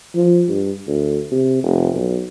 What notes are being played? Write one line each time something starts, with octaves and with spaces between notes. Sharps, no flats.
F3
G2
D2
C3
F1
B1